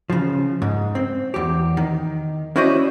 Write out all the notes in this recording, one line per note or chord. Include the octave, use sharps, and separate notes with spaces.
C#3 F3
G#2
C4
E2 G4
D#3
C#4 E4 F#4 C5 D5 D#5